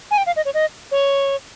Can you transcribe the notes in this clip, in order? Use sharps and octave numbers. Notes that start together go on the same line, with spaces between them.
G#5
G5
F5
D#5
C#5
D#5
C#5